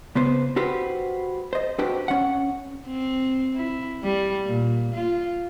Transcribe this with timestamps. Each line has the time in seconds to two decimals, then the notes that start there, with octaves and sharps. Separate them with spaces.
0.15 C#3 B3 B4 C5
0.56 F#4 G4 B4 C5
1.53 C5 D#5
1.78 D4 F#4 G4 B4 C5
2.08 C#4 F#5
2.87 C4
3.55 E4
4.03 G3
4.46 A#2
4.94 F4